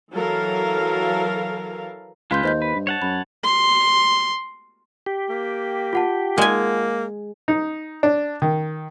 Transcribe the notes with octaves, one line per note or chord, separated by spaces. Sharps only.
E3 F#3 A4 A#4 F5
C#2 G#3 F4 B4 F5 C6 G6
D#2 C5 D#5 G6
B4
G2
C#5 F#5 A5
F#2 B5
C6
G4
A#3
F4 F#5 A5
G#3 A#3 G#5
D#4
D4
D#3